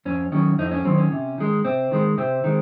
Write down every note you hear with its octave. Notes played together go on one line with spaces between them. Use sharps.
F2 C#4
D#3 F#3 C#4
F2 D#4
C#4
D#3 F#3 C4
C#4
C3
D#3 G#3
C3 C4
D#3 G#3
C3 C4
D#3 G#3